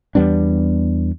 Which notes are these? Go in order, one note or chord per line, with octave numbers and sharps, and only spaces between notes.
E2 G3 B3 D4